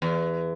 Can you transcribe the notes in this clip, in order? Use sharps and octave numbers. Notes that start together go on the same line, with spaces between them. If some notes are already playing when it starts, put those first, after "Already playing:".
E2